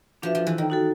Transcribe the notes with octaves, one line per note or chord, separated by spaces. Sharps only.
F3 D4 F#4 B4 E5
F3
E3
D#3
D#4 F#4 A4